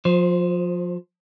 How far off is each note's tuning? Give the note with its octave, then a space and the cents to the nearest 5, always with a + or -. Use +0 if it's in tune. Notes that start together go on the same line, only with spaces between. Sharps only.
F3 +30 C5 +0